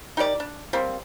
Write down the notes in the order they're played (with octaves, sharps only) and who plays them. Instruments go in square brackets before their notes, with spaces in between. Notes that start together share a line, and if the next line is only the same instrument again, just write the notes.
[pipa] D#4 G4 A#4 D5
D4
G3 A#3 C4